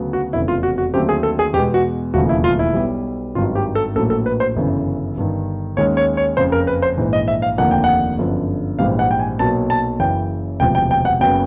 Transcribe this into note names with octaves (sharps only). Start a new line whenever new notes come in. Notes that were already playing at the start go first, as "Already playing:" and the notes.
Already playing: D2 C#3 F#3 B3
F#4
F1 E2 C#3 E4
F4
F#4
F#4
D#2 D3 F#3 A3 C4 G4
G#4
A4
G#4
E2 B2 G#3 G4
F#4
E1 D#2 C#3 F3 A3 F#4
E4
F4
E4
B1 B2 G3
G#1 G2 D#3 F#3 F4
G4
A4
A#1 A2 F#3 A#3 A4
A4
B4
C5
G1 F#2 C#3 E3
G1 G2 D#3
D#2 D#3 G#3 C#4 C#5
C#5
C#5
F#1 F2 C#3 C5
A#4
B4
C5
A#1 G#2 E3
D#5
E5
F5
F1 D#2 D3 F3 A#3 F#5
G5
F#5
G1 F#2 D3 F3
A#1 G#2 E3 G3 F5
F#5
G5
G#5
B1 A#2 F#3 A#3 A5
A5
F#1 F#2 C#3 E3 G5
E1 D2 C3 F3 G5
G5
G5
F#5
F#1 C#3 F#3 B3 G5